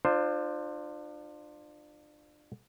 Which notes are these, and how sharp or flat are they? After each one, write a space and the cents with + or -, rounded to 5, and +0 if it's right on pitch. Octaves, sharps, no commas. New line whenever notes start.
D4 +30 F4 +0 C5 +5